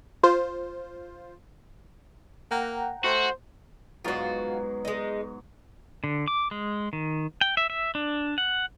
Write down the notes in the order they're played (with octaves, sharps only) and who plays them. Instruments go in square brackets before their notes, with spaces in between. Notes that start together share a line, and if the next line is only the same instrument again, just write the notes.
[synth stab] F4 C5
[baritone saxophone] A#3 [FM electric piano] F#5 G5 A#5
[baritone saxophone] A3 [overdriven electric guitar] F#4 [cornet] C5
[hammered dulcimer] G#2 B2 F#3 [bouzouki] F4 F#4
[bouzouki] G#3 D#4
[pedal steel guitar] D3
D6
G#3
D#3
G5
E5
E5
D4
F#5